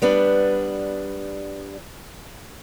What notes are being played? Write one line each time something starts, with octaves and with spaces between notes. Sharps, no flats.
G3 B3 D4